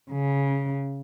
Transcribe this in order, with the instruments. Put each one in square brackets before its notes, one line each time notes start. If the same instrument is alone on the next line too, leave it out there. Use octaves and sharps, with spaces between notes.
[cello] C#3